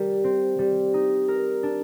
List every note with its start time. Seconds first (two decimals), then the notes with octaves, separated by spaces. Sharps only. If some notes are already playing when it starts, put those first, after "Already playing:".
Already playing: G3 A#4
0.24 C4
0.59 G3
0.94 D#4
1.28 A#4
1.63 D4